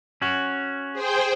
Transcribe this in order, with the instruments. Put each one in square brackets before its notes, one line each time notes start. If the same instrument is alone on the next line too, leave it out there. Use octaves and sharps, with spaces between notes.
[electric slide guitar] C#4 F#4
[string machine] G#4 C5 G5